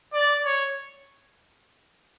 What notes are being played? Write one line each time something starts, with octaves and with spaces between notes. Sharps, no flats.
D5
C#5